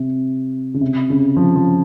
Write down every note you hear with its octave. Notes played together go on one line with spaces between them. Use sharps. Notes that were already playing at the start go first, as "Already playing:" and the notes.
Already playing: C3
C#3
C3
C#3
F3
F3